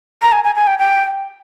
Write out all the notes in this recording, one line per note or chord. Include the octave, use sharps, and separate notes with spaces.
A#5
G#5
G#5
G#5
G5
G5